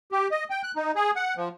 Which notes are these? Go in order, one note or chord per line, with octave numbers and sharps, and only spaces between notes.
G4
D#5
G5
F#6
D#4
G#4
F#5
F3